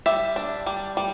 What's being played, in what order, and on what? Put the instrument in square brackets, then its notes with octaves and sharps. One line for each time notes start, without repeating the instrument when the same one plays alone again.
[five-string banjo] G3 E5
D4
G3
G3